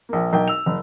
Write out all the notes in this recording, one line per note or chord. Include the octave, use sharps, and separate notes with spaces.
A#1 A#3
B1 A#4 G5
E6 F7
F#1